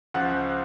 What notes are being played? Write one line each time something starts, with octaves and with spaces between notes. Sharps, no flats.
C#2 C#3 F3 F#5